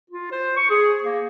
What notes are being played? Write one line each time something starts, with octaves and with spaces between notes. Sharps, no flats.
F4
C5
C#6
G#4
A#3